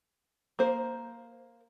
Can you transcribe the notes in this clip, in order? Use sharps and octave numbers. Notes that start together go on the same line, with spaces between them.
A#3 C5